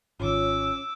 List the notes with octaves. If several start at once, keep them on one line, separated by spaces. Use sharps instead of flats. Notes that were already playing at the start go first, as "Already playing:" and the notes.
G#1 D#3 C#4 F4 C#5 D6 E6